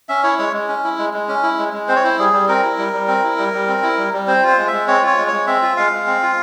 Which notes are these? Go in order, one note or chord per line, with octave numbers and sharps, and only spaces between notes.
C#4 E5
E4 C#5
G#3 C#5
G#3
C#4
E4
G#3
G#3
C#4
E4
G#3
G#3
C4 C5
C#5
E4 C5
G3 G#4
G3
C4 A#4
E4
G3
G3
C4
E4
G3
G3
C4
E4
G3
G3
C4 C5
F4 C5
G#3
E5
G#3
C4 C#5
F4 C#5
G#3
G#3 C#5
C4 E5
F4
G#3 F5
G#3
C4
F4